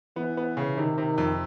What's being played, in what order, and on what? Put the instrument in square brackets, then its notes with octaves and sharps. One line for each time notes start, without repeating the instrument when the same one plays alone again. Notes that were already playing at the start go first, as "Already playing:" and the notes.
[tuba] E3 [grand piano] B3
[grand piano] B3
C#3
[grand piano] C3 [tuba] D#3
[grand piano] C3
F2